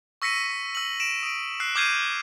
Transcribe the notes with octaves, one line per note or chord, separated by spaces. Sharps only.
C#6 E6 A#6 B6 C#7 D#7
E6 F#7
D7 E7
D#6 D7
E6 F#6 C7
D6 F6 G6 G#6 C7 D#7